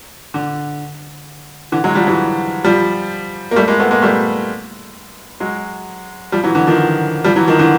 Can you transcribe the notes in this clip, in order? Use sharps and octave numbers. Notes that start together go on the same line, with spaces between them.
D3
D3 E3
F#3 G#3
F3 G3
E3 F#3
F3 G3
A#3
G3 A3
G#3 A#3
A3 B3
G#3 A#3
G3 A3
F#3 G#3
F3 G3
E3 F#3
D3 E3
D#3 F3
F3 G3
E3 F#3
D#3 F3
D3 E3